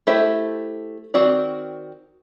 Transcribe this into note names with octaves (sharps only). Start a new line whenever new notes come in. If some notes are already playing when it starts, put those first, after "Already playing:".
A3 E4 G4 C5 E5
D#3 C4 F#4 A#4 D5